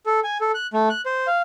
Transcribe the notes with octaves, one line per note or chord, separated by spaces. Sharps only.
A4
G#5
A4
F#6
A3
F#6
C5
F5